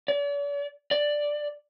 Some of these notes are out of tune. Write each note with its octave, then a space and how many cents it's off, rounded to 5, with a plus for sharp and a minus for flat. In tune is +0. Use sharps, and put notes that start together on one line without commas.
D5 -45
D5 +5